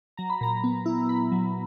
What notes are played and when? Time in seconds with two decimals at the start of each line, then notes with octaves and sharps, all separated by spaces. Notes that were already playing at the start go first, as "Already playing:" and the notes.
0.17 F#3 A#5
0.30 B5
0.41 A#2 A#5
0.64 B3
0.86 E4
1.08 E4 B5
1.32 F#3